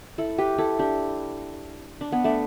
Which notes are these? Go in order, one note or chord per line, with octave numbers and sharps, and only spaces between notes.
E4 A4
G4 B4
E4 A4
D4 G4
D4
B3
A3 D4